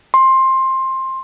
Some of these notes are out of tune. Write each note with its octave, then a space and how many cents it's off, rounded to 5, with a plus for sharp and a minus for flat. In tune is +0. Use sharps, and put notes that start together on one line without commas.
C6 +15